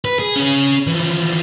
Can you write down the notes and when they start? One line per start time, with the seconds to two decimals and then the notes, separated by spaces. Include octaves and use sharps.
0.05 B4
0.19 G#4
0.36 C#4 G#4
0.87 E3 F3